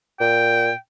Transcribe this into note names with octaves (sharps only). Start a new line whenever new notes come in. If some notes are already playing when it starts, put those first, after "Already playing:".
A#2 G5